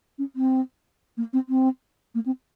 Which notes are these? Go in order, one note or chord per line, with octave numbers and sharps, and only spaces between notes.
C#4
C4
A#3
C4
C4
A#3
C4